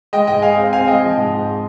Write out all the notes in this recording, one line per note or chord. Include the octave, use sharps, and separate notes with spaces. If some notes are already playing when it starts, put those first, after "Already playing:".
G#3 D#5 G5
G#2 D#5 G5
G#3 F5 G#5
C4
C4 F5 G#5
G#3 D#5 G5
F3
G#2
G#2